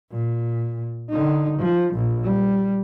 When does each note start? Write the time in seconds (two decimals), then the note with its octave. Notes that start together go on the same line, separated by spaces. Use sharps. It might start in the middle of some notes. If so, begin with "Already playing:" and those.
0.11 A#2
1.10 D3 D#4
1.59 F3
1.94 A#1
2.23 G3